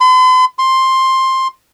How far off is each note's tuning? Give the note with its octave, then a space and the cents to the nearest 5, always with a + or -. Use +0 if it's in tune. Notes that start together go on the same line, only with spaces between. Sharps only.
C6 -45
C6 +10